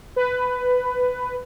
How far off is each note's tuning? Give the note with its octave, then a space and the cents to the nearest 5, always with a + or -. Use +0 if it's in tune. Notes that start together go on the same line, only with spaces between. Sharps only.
B4 +15